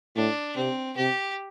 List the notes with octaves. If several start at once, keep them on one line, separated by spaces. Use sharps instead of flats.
A2 D4
C3 C4
C3 G4